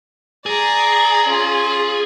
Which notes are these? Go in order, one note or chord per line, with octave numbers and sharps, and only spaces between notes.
G#4 D5 A#5
C#4 F4